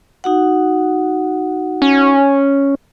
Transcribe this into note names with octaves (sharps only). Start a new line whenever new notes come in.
D#4 F#4 F#5
C#4